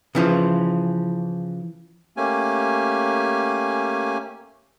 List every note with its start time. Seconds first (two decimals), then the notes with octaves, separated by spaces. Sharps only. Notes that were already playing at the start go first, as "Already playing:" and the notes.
0.15 C#3 E3 F3
2.17 A3 A#3 C#4 G4 G#5